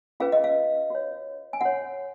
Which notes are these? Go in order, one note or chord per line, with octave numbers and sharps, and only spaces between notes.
C#4 F4 G#4 B4 F5
D#5
F5
F#4 C#5
G#5
F#4 C#5 F#5